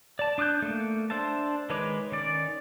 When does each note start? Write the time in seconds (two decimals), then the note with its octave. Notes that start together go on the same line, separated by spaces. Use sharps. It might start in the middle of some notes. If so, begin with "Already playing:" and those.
0.19 D5 A5
0.38 D4 D6 D#6 F#6 G6
0.62 A3 A#3
1.10 D4 C5 E5 A5
1.70 D#3 G#3 B4 C#5 D6
2.12 D#3 C#4 D5